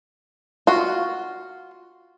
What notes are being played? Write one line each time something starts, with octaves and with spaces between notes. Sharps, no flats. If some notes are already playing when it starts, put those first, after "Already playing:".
F4 F#4